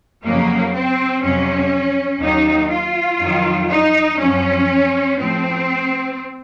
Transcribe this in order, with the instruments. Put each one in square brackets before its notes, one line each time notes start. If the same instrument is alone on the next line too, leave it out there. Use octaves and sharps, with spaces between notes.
[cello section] F2 C#3 F#3 A#3
C4
F2 C3 F#3 C#4
D#2 D#3 F#3 D#4
F4
F2 D#3 F#3
D#4
F#2 F3 C#4
A2 F3 C4